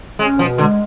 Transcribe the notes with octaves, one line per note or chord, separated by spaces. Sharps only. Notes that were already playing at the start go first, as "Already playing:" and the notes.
G#3 C#4
B2 F3
D3 G#3